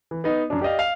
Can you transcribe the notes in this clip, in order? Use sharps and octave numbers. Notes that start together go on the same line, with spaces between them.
E3
B3 D#4 D#5
F#2 D4
G4 D5 D#5 F5
F5